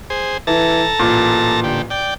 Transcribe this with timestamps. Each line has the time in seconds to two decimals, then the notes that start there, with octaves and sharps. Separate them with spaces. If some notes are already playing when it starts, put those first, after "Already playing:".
0.10 G#4 C5
0.47 E3 A4 A5 A#5
0.99 A1 A#2
1.64 D3 G4
1.90 D5 G5